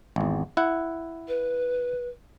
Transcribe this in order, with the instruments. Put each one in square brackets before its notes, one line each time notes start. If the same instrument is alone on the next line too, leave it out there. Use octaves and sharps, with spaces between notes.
[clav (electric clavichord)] G#1 E2
E4 F#5
[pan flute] B4